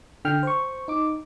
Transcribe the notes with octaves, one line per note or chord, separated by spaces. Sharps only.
D3 G5 F6
C5 C#6
D#4 D6